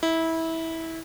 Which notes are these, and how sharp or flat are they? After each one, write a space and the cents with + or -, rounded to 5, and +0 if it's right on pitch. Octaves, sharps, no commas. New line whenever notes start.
E4 -20